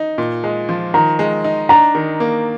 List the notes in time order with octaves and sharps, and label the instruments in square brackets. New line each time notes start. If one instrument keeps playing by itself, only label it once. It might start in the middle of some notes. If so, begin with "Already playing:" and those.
Already playing: [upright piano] D#4
A#2
G#3
F3
[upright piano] D#3 [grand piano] A#5
[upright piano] G#3
D#4
[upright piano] D4 [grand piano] A#5
[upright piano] D#3
A#3